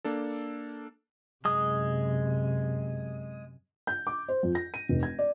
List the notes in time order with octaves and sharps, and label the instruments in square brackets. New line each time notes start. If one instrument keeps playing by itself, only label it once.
[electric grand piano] A#3 D4 A4
[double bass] F#2 C3 [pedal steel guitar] G#3 D#6
[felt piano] G6
D6
C5
F2
A#6
D#7
F1
G#6
D5